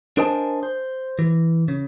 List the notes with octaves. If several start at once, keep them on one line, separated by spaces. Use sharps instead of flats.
D4 A#4 C5 D#5 G#5 A5
C5
E3
C#3